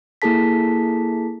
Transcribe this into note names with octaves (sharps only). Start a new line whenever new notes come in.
A#3 E4 G#4 A4 A5 B6